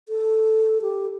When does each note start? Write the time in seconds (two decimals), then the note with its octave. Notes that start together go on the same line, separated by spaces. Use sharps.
0.09 A4
0.82 G4